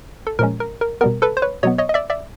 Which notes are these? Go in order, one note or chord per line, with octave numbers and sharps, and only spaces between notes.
A4
A#2 F3 G#3 C#4 A#4
A#4
A#4
B2 G3 B3 A#4
A4 B4
C5
B4 C#5
B2 F#3 B3 C#5 D#5
C#5 D#5
D#5
D5 E5
D5 E5